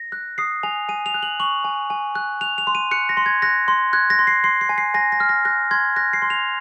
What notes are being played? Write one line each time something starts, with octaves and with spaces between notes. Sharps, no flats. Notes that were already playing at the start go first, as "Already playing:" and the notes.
Already playing: A#6
F#6
D#6 C7
G#5 F7
G#5 D#7
F7
F#6
F#7
C#6 F#7
G#5
G#5
F#6
F#6 F7
F7
C6
D#7
F#6 C#7
A#6
C6
G#6
F#6 A#6
C6
F#6 G#6
A#6
C6
C7
C6 C7
C7
G#5
C7
G#5 A#6
A#6
F6
A#6
F#6 A#6
C6 G#6
F#6 A#6
C7
C6
F7